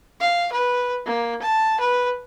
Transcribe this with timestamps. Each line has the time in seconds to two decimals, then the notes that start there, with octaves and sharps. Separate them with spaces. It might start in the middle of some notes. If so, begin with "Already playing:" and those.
0.20 F5
0.52 B4
1.06 A#3
1.42 A5
1.80 B4